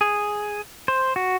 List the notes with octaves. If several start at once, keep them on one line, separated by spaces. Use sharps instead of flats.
G#4
C5
F#4